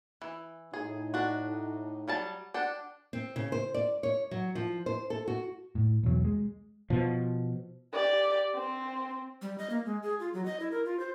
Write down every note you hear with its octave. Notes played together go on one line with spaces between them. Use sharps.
E3
A2 D#4 G#4
D4 F#4
F#3 G3 A5
D4 F#5 G5
C4
C#3
C5
D5
C#5
F#3
F3
C5
A4
F#4
A2
B1 E2 F#3
G#3
B2 F3
G4 D5
C4
G3
D#5
A#3
G#3
G#4
F4
F#3
D#5
E4
A#4
F4
C5